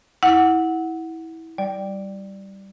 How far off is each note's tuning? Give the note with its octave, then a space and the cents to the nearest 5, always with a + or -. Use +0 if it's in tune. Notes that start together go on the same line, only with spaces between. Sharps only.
E4 -20 F#5 +0
G3 -10 D5 +0